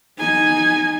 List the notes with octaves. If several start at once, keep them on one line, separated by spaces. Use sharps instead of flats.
D#4 G#5